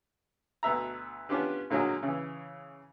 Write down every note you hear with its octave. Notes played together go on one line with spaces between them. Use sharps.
D2 B2 B4 E5 A#5
B3 C#4 D4 F4 G4 B4
A#2 D3 F#3 G#3 A#3
C#3 E3